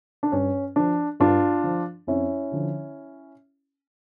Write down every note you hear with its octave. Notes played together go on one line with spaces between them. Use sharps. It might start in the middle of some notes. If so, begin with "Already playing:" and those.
D4
G2 C#4
F3 D4
G2 D4 F4
F3
F2 C#4 E4
D3 F3